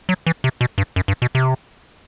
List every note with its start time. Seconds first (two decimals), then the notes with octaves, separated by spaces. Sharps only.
0.09 F#3
0.27 E3
0.44 C3
0.61 B2
0.78 G2
0.96 F#2
1.08 G2
1.22 B2
1.35 C3